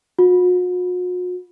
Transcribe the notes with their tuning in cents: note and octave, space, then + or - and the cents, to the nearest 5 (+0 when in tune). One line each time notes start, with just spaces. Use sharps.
F#4 -45